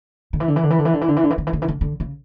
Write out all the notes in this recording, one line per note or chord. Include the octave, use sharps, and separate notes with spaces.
D3
E3
D3
E3
D3
E3
D3
E3
D3
E3
D3
E3
D3
E3
D3
E3
D3
E3
D3
D3
C#3